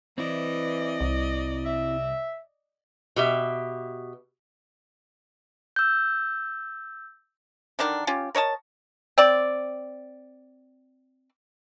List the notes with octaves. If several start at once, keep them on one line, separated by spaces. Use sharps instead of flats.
E3 C4 E4 D5 D#5
C2
E5
B2 G4 E5
E6 G6
D3 D#3 D4 A#4
C#4 F4 G4
A#4 C#5 D#5 A5
C4 D5